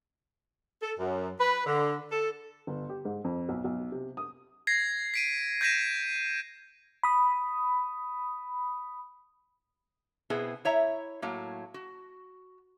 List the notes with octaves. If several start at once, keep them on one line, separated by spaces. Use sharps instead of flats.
A4
F#2
B4
D3
A4
G1
G4
G#2
F2
B1
B1
C3
D#6
G#6 A#6 C7
B6 D7 D#7
G6 G#6 A#6 B6 D#7 E7
B5 D#6
B2 B3 C4 E4 G#4
E4 C#5 E5 A#5
A2 F#3 A#3
F#4